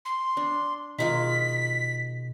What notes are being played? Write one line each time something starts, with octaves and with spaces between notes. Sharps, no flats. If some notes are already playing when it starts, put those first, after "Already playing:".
C6
D4
B2 D#3 G#3 F4 B6